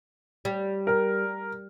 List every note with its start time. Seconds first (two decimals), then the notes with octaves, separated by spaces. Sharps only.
0.45 G3
0.87 A#4